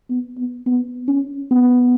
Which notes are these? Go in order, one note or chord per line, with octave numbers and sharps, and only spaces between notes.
B3
B3
B3
C#4
B3